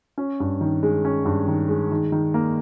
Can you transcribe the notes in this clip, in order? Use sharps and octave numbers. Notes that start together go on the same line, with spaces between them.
C#4
G2
D#3
G#3
C#4
G2
D#3
G#3
D#3
D#3
A#3